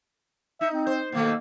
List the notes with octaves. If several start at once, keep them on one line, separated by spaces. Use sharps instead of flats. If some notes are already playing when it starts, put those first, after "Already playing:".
D#4 E5
C4
C5
B2 D#3 A3 A#3